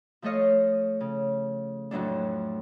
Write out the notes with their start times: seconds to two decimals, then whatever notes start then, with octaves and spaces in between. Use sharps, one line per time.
0.22 F3 A3 A4 C#5 D#5 F5
1.01 C#3
1.91 F2 A2 F#3 D4